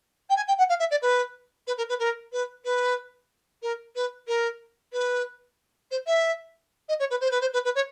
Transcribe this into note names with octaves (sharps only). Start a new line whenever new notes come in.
G5
G#5
G5
F#5
F5
E5
D5
B4
B4
A#4
B4
A#4
B4
B4
A#4
B4
A#4
B4
C5
E5
D#5
C#5
B4
C5
B4
C5
B4
B4
C#5